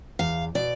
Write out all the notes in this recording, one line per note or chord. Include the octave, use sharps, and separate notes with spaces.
E2 F5
B2 D5